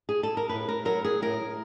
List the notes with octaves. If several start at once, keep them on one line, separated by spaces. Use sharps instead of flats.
G#4
A4
A#4
A2 B4
A#4
F#3 A#4
G#4
A2 A#4